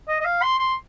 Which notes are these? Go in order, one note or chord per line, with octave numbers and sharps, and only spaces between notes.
D#5
D#5
F5
C6
C6